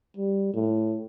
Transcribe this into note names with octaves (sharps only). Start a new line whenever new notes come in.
G3
A2